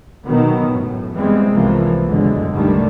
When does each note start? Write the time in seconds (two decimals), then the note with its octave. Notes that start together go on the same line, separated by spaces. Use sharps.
0.25 B2 D#3 F#3 B3
0.70 F#2 A2
1.14 E3 G3 G#3 B3 C4
1.51 C2 C3 E3 F3 A#3
2.06 F#1 E2 A2 D3 G#3
2.51 C2 A2 D3 D#3 G3 A3